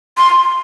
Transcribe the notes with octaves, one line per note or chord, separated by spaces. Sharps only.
C6